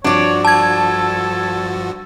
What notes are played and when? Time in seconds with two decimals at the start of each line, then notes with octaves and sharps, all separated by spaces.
0.04 G2 F3 D4 F#4 C#5 D5
0.45 A4 A5 G#6